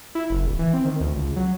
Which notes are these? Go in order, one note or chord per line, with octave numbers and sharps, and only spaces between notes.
E4
F#1
D1
E3
C4
D#3
D2
C#2
F#3